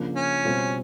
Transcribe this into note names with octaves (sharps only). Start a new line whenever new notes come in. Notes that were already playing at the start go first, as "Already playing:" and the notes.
Already playing: C#3 F3 A#3 D4
C#4
B2 G3 C4 F4